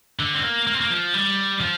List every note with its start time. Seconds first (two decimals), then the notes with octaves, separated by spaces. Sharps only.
0.19 D3
0.34 C4
0.43 A#3
0.67 A#3
0.74 C4
0.81 A#3
0.90 F3
1.14 G3
1.61 F3